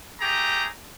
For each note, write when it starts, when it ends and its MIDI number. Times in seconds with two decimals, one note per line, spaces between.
0.20 0.66 57
0.20 0.66 67
0.20 0.66 68
0.20 0.66 82